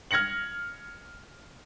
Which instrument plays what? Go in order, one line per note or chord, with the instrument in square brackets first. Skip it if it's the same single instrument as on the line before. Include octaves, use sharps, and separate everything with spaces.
[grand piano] F6 G#6 A#6 C#7 F#7